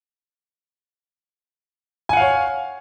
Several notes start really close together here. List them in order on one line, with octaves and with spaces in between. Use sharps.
G#5 F#5 F5 C#5